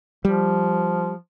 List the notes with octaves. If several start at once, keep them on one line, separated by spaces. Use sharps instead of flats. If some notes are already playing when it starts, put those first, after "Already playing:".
F3 G3